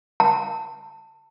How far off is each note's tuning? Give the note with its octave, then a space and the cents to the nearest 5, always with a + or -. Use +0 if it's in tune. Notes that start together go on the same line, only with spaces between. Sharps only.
A5 +25